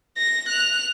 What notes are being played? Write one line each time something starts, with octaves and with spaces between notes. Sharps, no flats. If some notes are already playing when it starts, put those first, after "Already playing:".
A#6
F#6 F7